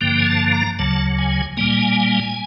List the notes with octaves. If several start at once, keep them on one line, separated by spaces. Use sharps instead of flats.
G2 D3 F3 A#3 G5
G#5
A5
A#5
D2 C#3 F#3 A5
G#5
A#2 G3 A#3 G#5